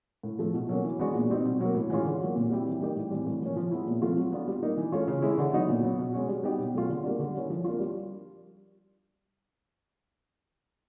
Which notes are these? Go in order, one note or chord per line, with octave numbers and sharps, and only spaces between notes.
A2
F3 A3
B2
F#3 A#3 C#4
E3
G#3 B3 D4 F#4
A#2
G3 C4 D#4
B2
F#3 A#3
A2
E3 G#3 C#4 F4
D3
F#3 A#3
A#2
G3 C4 E4 G4
E3
G3 A#3 D#4 G4
A2
E3 G3 C4
A2
F3 A#3 C#4
F3
G#3 B3 E4
A#2
F3 A3 C4 F4
F#3
B3 D4 F4
G3
A#3 D#4
E3
A3 C#4 F4
C#3
E3 G#3 C#4 E4
D3
F#3 B3 D#4 F#4
A#2
F#3 B3
B2
G#3 C#4 F#4
G3
B3 D#4 G4
B2
F#3 A3 C#4 F4
D3
G3 A#3 D4
D3
G3 A#3 C#4 E4
F3
A#3 D4 F4
G3